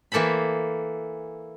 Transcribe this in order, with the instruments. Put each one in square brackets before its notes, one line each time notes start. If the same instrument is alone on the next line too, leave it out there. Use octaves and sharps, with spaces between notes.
[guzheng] E3 A#3 A4 C5 B5